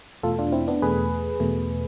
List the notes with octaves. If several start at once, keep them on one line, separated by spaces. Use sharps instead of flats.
E2 B2 A3 F4 A4
D4 F4
C4 E4
B3 D4
E2 B2 A3 G#4 B4
E2 B2 A3